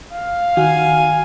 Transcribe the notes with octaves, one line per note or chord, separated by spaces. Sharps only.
F5
D#3 F#4 G#5